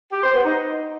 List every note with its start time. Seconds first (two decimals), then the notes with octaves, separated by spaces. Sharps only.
0.12 G4
0.23 C5
0.34 B3
0.44 D#4